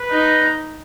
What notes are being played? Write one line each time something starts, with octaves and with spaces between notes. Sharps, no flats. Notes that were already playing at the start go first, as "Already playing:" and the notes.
Already playing: B4
D#4